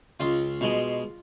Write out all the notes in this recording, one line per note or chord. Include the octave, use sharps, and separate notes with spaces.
C#2 F4
B2 G#3